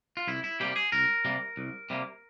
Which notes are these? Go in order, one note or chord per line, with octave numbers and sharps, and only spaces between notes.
F4
C2 E4
E4
C3 G3 A#3 G4
G#4
C2 A#4
C3 G3 A#3
C2
C3 G3 A#3